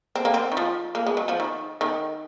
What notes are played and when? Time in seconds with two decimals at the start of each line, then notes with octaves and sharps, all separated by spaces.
0.15 C4
0.25 A#3
0.34 C4
0.52 D#3
0.57 F3
0.95 A#3
1.06 G#3
1.17 F#3
1.28 F3
1.40 D#3
1.81 D#3